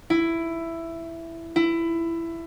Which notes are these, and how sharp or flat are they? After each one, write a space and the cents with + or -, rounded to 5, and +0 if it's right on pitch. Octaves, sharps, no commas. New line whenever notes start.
E4 +10
E4 +15